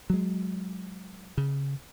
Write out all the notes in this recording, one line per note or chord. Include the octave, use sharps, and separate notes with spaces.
F#3 G#3
C#3